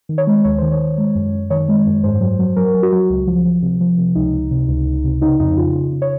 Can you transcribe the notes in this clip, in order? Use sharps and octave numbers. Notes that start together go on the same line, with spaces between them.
D#3
C#5
G#3
D#2 C#5
D#3 C5
C#5
D#3
G#3
F#2
F#2
D#3 C#5
G#3
F#2
G#2 C5
F#3
F#3
F#3 A#4
F#3
F#4
F#3
C#2
F3
F3
C3
F3
C3
C#2 D#4
C#2
C3
C#2
C#2
C3
C#3 D#4
F2 D#4
C#3 F4
C#3
C#3
C#5